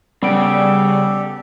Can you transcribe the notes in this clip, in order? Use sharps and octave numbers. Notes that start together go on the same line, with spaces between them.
C#3 G3 B3 G4 A4 D7